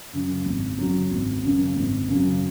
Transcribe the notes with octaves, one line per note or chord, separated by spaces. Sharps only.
F#2 C#3 F#3
G#1
F#2 C#3 F#3
G#1
F#2 C#3 F#3
G#1
F#2 C#3 F#3